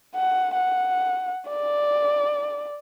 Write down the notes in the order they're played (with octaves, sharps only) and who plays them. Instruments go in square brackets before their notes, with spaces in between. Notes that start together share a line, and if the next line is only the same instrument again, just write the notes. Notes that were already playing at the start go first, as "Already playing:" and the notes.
[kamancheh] F#5
F#5
D5